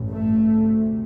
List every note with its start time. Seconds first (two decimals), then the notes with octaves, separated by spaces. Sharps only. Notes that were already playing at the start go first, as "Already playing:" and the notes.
Already playing: A1 G2
0.12 A3
0.51 D2 C3